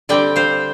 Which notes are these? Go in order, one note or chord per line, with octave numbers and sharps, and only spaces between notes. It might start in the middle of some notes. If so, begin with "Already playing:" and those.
D3 G3 C4 D5 G5
C5 F5